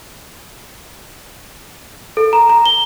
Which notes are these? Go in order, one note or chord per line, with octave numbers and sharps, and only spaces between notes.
A4
A#5
A#5
G7